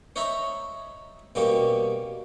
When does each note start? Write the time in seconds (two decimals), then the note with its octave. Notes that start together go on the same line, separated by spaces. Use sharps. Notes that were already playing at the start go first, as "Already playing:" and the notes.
0.16 C5 C#5 D#5 E5 A#5 B5
1.35 B2 G3 A#3 C#4 G4